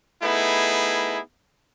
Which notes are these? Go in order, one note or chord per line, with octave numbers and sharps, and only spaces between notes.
A3 B3 D#4 E4 G#4